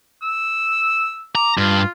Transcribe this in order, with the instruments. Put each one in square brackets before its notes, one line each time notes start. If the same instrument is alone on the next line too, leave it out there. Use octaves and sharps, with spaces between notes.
[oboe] E6
[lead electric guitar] A#5 [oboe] D6
[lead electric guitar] G2 [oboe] F4